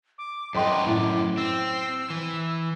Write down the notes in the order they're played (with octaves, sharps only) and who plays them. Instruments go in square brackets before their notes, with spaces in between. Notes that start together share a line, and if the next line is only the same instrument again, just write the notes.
[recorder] D6
[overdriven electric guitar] F#2 B4 [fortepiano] D#5 G5 C6 [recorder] D6
[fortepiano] A2
[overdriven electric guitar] C4 [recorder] E6
[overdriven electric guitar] E3